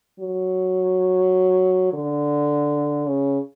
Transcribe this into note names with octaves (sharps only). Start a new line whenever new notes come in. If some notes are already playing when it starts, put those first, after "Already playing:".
F#3
D3
C#3